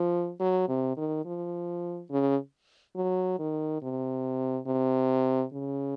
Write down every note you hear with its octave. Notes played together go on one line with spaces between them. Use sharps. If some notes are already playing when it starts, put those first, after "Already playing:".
Already playing: F3
F#3
C3
D#3
F3
C#3
F#3
D#3
C3
C3
C#3